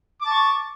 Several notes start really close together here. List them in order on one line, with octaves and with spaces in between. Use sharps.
D6 A5 C#6